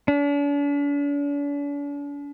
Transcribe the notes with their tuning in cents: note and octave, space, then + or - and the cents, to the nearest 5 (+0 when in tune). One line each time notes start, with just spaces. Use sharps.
D4 -45